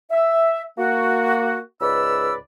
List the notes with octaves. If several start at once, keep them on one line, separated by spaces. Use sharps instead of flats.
E5
A#3 F#4
C#2 G#2 B4 D5 B5 E6